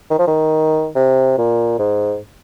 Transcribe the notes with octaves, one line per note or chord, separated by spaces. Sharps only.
D#3
F3
D#3
C3
A#2
G#2